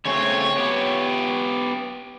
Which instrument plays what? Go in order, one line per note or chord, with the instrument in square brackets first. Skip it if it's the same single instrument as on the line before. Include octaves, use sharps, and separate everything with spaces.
[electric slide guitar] C#3 A3 C4 [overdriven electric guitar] C#5
[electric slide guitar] B3 G4